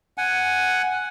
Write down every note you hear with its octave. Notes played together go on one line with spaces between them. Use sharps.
F#5 G#5